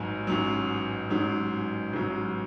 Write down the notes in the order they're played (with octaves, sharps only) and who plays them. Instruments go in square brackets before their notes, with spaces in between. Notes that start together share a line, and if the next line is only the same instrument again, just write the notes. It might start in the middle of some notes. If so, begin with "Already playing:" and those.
Already playing: [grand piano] A1 G#2 F#3 G#5
A1 G#2 F#3
A1 G#2 F#3
A1 G#2 F#3